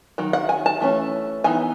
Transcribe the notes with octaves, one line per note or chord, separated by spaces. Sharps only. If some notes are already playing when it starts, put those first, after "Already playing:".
D#3 F#3
F#5
G#5
A5
E3 A3 C#4
E3 B3 D#4 G#5